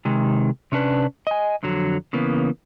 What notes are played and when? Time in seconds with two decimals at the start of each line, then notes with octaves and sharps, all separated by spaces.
0.05 C3 D#3 G#3
0.72 C3 C#4 D4 B4
1.27 D#5 G#5
1.63 F2 D3 F#3
2.13 C#3 E3 A#3 B3